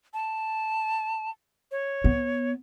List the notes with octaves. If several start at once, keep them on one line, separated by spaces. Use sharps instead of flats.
A5
C#5
B3